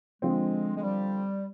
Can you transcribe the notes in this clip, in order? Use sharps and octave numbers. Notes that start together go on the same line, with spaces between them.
D3 F3 G#3 C4
G#3
G3